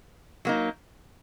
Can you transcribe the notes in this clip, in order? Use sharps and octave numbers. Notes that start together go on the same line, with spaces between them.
F#3 A#3 D#4